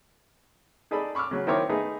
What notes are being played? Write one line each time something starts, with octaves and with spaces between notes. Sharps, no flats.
D#4 G#4 A4 D5 B5
B5 C#6 D6 E6 F6
C#3 F#3
D#3 C4 E4 A#4 C#5 D6
A3 B3 D#4 G#4